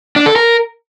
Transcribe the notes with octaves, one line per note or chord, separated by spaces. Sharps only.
D4
A4
A#4